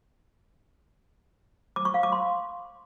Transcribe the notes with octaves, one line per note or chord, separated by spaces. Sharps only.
D6
C#6
F5
D6
C6